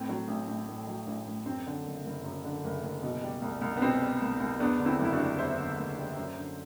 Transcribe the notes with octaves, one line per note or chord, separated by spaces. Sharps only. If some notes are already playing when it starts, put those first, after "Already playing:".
Already playing: A2 C4
F#3
A1
A1
A2
F#3
A1
A1
F#2 C4
D3
F#1
F#1
F#2
D3
F#1
F#1
B2
G3
C2
C2
B3
B2 C4
G3
C2
C2
E2 B3 D4
D3
C4 E4
F#1 E4
D4 F#4
G3
E2 C5 E5
D3
F#1
G3
F#2
D3